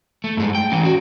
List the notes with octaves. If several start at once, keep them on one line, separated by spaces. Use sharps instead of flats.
A3
G2 G#3
G5
E3 C#4
F#4